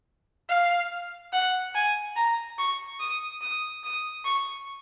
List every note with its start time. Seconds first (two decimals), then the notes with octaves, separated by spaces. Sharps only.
0.49 F5
1.32 F#5
1.75 G#5
2.16 A#5
2.58 C#6
3.00 D#6
3.41 D#6
3.83 D#6
4.25 C#6